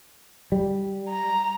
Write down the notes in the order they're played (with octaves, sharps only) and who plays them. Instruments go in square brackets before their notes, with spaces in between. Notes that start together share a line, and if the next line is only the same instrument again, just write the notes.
[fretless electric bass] G3
[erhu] A#5